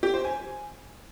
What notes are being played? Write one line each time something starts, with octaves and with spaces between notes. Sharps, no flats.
G4
C5
G#5